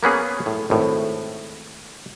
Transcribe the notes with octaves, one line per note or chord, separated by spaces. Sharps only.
A#3 B3 C#4 G#4
A2
G#1 A2